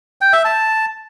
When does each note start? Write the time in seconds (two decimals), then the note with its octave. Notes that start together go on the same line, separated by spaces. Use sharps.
0.21 G5
0.33 E5
0.45 A5